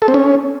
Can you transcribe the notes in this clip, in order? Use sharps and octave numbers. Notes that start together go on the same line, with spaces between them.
A4
C4
C#4